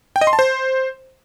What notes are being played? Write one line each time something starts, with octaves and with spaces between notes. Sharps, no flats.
G5
D#5
C6
A5
C5